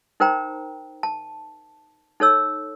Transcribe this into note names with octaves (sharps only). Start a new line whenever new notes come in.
D#4 A#4 C5 G5 A#5
A5
D#4 A4 C#5 E6